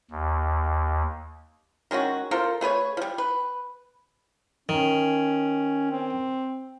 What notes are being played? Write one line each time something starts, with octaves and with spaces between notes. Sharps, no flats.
D#2
D#3 G#3 C#4 F#4
F4 A4 A#4 C5
A3 G#4 B4 C#5
F3 G3
B4
D#3 C#4
C4